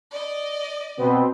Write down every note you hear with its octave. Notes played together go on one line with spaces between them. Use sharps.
D5 D#5
B2 B3 C4